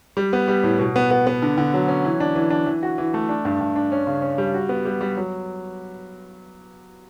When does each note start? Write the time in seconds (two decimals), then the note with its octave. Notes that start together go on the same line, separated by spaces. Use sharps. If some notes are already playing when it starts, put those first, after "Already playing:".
0.17 G3
0.33 B3
0.48 G3
0.63 A2
0.79 B2
0.96 B3
1.11 B3
1.27 B3
1.42 D3
1.57 D3
1.74 F#3
1.88 C#4
2.05 E3
2.20 D4
2.36 E3
2.50 D4
2.66 E3
2.83 F#4
2.98 E3
3.14 A3
3.29 D4
3.45 G2
3.61 G2
3.76 D4
3.92 C#4
4.07 C#3
4.22 C#4
4.38 G3
4.54 F#4
4.69 B3
4.85 G3
5.01 G3
5.17 F#3